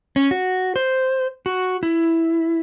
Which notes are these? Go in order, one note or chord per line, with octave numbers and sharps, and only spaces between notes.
C#4
F#4
C5
F#4
E4